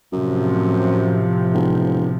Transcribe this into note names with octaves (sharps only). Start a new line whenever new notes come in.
F#2 A2 C3 F3
E1